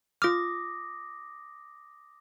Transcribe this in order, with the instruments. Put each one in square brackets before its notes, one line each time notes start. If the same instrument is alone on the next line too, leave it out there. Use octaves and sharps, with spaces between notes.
[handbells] F4 F6 [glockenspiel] D6 D#6 A#6